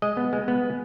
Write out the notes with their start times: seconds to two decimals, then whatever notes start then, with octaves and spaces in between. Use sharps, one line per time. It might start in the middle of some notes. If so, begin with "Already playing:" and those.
0.02 G#3 D#5
0.17 B3
0.33 G#3
0.48 B3